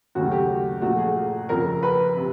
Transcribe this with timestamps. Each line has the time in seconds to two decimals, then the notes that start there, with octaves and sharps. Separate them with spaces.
0.15 D#2 C#3 F#3 A3 F#4
0.32 G4
0.82 A#2 F3 A3 F#4
0.98 G#4
1.49 F2 C#3 F3 A#4
1.83 B4
2.17 C3